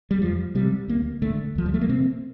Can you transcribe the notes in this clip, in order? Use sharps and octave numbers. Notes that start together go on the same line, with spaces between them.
G3
F2 F3
C3 G3
D2 A#3
D3 A3
D2 F3
G3
A3
A#3
C3 C4